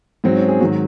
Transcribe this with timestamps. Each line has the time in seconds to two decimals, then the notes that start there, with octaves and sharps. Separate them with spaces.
0.24 G#2 F#3 C4
0.36 C#4
0.48 G#4
0.60 G#2 D#3 F#3 F#4